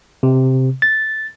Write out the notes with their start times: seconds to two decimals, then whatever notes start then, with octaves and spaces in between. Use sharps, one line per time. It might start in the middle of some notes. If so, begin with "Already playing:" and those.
0.23 C3
0.82 A6